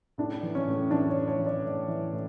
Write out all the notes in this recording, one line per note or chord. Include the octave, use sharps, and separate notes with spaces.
A2 D4
E3
C#4
A2
E3 D4
C#5
A2
C#5
E3
D5
A2
E3
A2